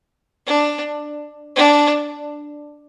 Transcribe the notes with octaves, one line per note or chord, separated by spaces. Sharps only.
D4
D4